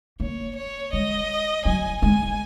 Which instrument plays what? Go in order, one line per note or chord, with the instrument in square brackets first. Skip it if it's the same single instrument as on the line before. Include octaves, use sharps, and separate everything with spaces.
[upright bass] A#3 [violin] C#5
[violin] C#5
[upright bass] G#3 [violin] D#5
[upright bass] F#3 [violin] G#5
[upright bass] G#3 [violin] G#5